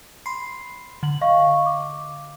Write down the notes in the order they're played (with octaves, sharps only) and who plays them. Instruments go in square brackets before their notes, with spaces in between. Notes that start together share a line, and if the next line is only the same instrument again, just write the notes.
[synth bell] B5 C6 C7
D3 F#7
[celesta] D#5 F5 C#6
D6